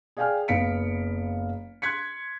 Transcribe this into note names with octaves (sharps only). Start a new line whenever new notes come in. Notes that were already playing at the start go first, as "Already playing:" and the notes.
G#4 D5 F5 G5 G#5 F6
F#1 B3 F5 B6 C#7 D7
C6 F#6 G#6 B6 C#7